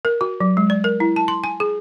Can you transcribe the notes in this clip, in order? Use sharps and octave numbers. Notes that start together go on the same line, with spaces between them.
A#4
F#4
F#3
G#3
D5
A#4
E4
A5
C6
G#5
G#4